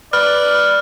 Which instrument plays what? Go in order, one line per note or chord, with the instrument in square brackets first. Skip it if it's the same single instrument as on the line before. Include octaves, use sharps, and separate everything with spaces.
[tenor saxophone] B4 [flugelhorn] D5 [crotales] F6